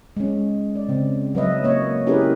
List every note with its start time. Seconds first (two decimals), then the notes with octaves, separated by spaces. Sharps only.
0.17 G#3 C#4
0.75 D5
0.89 C#3 C4
1.35 F#3 B4 D#5 E5
1.64 A#3 C#5 D#5
2.07 C#4 E4 G4 G#4 A#4 B4